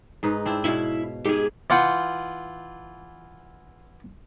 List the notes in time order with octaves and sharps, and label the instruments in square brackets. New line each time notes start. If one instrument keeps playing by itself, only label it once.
[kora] G#2 D#4 B4
C4 D4 E4
[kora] B2 C#5 F5 [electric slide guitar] E4
[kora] G#2 [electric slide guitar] G4 G#4
[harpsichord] E3 F4 F#5 G5